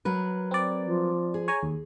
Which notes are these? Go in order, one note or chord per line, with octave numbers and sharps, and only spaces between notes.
F#3 A#4 B4
C4 D5
F3
G#4
C#5 G#5 A#5
D#2